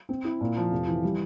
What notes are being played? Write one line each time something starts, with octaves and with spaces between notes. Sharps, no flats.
C4
E4
A#2
F3
F1
E3
G3